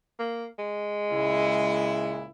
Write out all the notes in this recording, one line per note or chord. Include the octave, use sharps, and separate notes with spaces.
A#3
G#3
C#2 A#2 E4